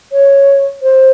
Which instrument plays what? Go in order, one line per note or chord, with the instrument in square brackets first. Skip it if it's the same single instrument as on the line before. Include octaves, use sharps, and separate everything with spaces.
[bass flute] C#5
C5